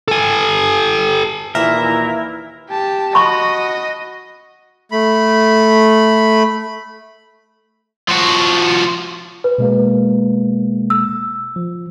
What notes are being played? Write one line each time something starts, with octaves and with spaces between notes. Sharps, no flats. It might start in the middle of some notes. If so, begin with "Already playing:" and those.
A4 G#5
D#2 A#2 E3 E4 A#4 E5
G4 A5
F#4 D#5 A5 B5 C#6
A3 B5
F3 F#4
B4
B2 G#3 A#3
E6
F3